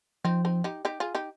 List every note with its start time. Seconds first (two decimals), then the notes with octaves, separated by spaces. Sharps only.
0.25 F3 C4 D#4
0.45 C4 D#4
0.64 D#4 G4
0.85 D#4 G4
1.00 F4 G#4
1.15 D#4 G4